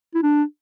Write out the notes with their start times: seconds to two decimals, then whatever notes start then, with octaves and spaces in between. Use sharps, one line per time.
0.14 E4
0.22 D4